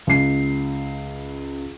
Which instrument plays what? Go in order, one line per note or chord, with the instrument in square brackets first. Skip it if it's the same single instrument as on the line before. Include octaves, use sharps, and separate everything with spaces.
[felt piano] C#2 C7